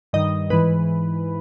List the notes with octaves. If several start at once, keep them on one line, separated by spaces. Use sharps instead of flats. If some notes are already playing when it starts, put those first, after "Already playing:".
G2 D#3 D#5
G#2 E3 B4